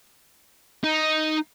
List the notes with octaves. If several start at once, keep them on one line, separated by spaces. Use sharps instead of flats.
D#4